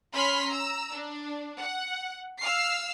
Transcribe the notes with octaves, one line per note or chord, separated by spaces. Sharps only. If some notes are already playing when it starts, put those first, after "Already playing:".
C#4 B5 C6 F6 B6
A#5 E6
D4
F#5
F5 E6 F6 C7